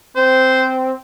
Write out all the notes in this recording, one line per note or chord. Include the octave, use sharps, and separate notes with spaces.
C4 C5